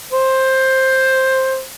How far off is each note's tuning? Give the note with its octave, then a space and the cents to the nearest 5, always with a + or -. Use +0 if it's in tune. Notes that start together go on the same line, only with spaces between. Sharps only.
C5 +10